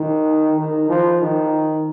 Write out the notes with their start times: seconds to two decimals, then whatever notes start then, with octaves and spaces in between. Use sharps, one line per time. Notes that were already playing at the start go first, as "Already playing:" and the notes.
Already playing: D#3
0.58 D#3
0.89 F3
1.22 D#3